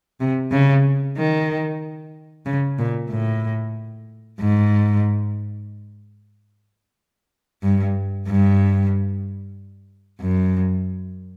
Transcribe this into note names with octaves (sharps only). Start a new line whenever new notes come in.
C3
C#3
D#3
C#3
A#2
A2
G#2
G2
G2
F#2